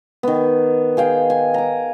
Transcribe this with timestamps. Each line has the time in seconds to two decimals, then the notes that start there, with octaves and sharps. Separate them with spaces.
0.23 D#3 B3
0.97 G#4 F5 G5
1.30 G#5
1.54 A#5 D6